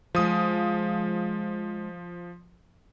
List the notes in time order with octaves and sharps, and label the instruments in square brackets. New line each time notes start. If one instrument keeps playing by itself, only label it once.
[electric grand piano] F3 D#6 [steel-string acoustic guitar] G#3 F5